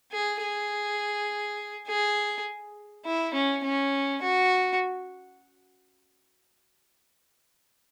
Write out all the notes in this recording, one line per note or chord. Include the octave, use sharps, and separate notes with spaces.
G#4
G#4
G#4
E4
C#4
C#4
F#4